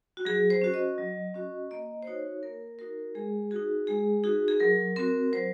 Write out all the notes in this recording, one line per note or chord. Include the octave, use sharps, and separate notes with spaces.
F#4
F#3 G#4
C5
C#4 F#4
D#5
F#3
C#4 F#4
A#3 D#5
C5
D#4 F#4 C#5
A#3 A#4
D#4 F#4 A#4
G#3 G#4
D#4 F#4 G#4
G#3 G#4
D#4 F#4 G#4
G#4
F#3 A#4
C4 F#4 A#4
F#3 C5